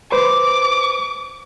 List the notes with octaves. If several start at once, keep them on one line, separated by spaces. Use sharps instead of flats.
B4 C5 D6